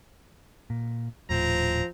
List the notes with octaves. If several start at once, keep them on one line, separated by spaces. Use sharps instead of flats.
A#2
D#1 A2 F3 C4 A#5